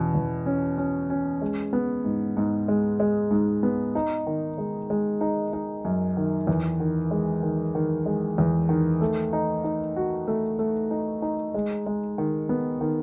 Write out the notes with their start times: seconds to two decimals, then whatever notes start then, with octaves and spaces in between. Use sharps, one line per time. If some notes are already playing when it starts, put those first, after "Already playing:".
Already playing: E2 B2 C#4
0.15 E2
0.46 C#4
0.78 C#4
1.10 C#4
1.41 G#3
1.73 B3
2.05 G#2
2.37 G#2
2.68 G#3
3.00 G#3
3.31 G#2
3.63 B3
3.95 D#4
4.27 D#3
4.58 G#3
4.90 G#3
5.21 D#4
5.53 D#4
5.85 F#2
6.17 D#3
6.47 E2
6.80 D#3
7.11 G#3
7.43 D#3
7.75 D#3
8.06 G#3
8.38 E2
8.69 D#3
9.01 A3
9.33 D#4
9.64 D#4
9.96 F#4
10.27 A3
10.59 A3
10.91 D#4
11.22 D#4
11.54 G#3
11.86 G#3
12.18 D#3
12.49 B3
12.81 D#3